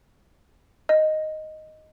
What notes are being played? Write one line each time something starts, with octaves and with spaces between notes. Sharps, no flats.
D#5